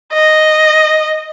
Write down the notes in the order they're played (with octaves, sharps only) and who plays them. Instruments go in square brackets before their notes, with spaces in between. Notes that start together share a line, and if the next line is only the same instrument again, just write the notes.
[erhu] D#5